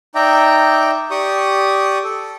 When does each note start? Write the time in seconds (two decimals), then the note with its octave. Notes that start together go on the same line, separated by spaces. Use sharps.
0.15 D#4 D5 E5 G5 A#5
1.11 G4 D5 C#6 D#6
2.04 A4